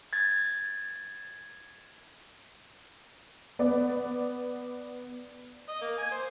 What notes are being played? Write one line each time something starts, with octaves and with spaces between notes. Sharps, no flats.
G#6 A6
B3 D5
D#5
A#3
G#5
C5